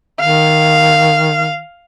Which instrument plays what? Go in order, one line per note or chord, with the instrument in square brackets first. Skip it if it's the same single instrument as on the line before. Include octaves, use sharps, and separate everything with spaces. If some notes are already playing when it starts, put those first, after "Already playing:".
[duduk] D#3 [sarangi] F5